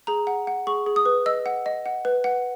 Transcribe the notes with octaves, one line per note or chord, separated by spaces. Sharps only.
G#4 A#5
F#5
F#5
G#4 C#6
G#4
D#6
B4
D#5 E6
F#5
D#5
F#5
B4
F#5